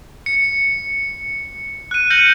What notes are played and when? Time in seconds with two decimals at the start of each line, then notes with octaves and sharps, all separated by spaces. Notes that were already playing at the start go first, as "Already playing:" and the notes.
0.26 C#7
1.91 F#6 D#7
2.10 F6 G6 A#6 C#7 D#7 F#7